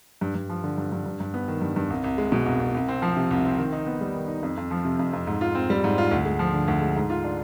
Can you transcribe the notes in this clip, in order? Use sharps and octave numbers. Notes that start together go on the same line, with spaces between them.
G2
G2
F3
D3
G2
G2
G2
G2
B3
D#3
G2
G2
C2
C2
G#3
B2
C2
C2
C2
C4
F3
C3
C2
C4
D#3
D#4
B3
G3
D#3
D#4
F2
F2
F3
C3
F2
F2
G#2
F4
C4
G3
G#2
F4
D2
G#3
F3
D3
D2
G#3
G#2
F4
D4